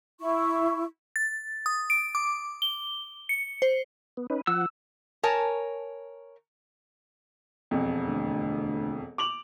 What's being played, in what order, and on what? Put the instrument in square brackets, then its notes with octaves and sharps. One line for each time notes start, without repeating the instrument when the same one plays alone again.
[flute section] E4 C#6
[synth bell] A6
D#6
D7
D6
G7
C#7
C5
[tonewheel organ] B3
C#4 D#4 B4
[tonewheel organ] F3 F#5 [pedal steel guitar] E6
[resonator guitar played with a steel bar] A#4 C#5 G#5 A5
[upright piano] E1 F2
[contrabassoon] D2
[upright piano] D6 F7 F#7